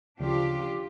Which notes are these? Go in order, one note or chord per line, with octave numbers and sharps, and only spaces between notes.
D2 C#3 F3 D4 F4 G4